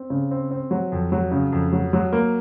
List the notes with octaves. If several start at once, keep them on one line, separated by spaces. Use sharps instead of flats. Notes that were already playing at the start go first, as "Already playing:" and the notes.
Already playing: C4
C#3
C4
C4
F#3
F2
F#3
C#3
F2
F#3
F#3
A#3